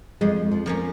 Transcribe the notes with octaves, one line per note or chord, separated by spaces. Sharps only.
F2 G#3
F3
F3 A#3 C#4